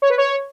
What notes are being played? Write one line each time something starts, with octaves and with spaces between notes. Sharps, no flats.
C#5
B4
C#5